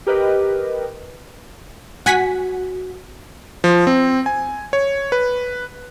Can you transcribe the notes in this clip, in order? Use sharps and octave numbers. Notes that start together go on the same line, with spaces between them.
G4 A#4 B4 D#5
F#4 F#5 G#5 B6
F3
C4
G#5
C#5
B4